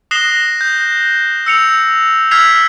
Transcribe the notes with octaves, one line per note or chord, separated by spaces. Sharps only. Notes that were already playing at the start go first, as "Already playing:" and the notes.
D#6 F#6 A#6 C7 E7 G7
G6
E6 C#7 F7
E6 F6 G#6 B6 C7 F7